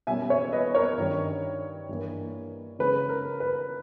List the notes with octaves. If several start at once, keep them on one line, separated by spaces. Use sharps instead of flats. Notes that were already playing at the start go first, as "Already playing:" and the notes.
B2 G3 A#3 C#4 E5 G#5
C#5 E5
B4 D#5
A#4 C#5
G2 D#3 G3 C#4
G2 E3 A#3
C#3 G#3 C#4 B4
A#4
B4